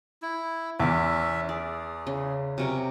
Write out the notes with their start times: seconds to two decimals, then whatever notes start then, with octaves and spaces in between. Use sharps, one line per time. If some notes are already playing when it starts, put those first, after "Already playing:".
0.22 E4
0.80 E2 C#4 E4 E5 D6
1.49 G#4 D5
2.07 C#3
2.58 C3 F#3 C#4 A#4